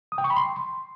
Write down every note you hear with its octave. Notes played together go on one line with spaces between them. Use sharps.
D#6
G5
C#6
B5
C6